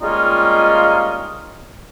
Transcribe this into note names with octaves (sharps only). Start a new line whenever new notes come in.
G3 G#3 A#3 C#4 D#4 F4